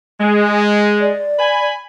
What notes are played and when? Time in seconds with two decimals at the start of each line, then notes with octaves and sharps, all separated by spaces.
0.20 G#3
1.01 D5
1.39 G#5 B5